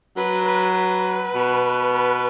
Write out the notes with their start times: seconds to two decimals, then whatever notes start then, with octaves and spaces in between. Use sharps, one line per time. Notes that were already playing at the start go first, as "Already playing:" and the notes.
0.17 F#3 B4
0.46 B4
0.75 B4
1.35 B2
1.94 B4